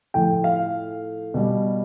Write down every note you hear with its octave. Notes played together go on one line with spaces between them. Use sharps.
A2 F3 A3 G5
F5
B2 G3